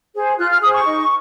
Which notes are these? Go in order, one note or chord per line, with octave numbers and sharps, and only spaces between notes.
G#4 C5
F4 F#6
F6
G#4 C5 D#6
C#6
D#4